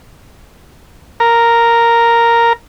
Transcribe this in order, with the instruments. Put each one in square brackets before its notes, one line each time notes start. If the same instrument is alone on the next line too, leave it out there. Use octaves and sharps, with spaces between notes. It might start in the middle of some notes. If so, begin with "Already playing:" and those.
[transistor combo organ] A#4